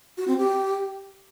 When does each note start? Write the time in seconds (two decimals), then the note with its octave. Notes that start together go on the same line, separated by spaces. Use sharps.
0.18 F#4
0.28 C4
0.38 G4